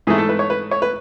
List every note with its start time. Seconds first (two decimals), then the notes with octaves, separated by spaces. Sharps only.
0.07 G#2 E3 A3 G#4
0.18 A4
0.29 B4
0.39 C#5
0.50 B4
0.71 C#5
0.82 B4